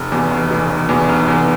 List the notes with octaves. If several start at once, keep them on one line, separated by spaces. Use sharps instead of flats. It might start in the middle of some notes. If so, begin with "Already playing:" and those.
Already playing: F1
E2 B2
F1
E2 B2
F1
E2 B2
F1
E2 B2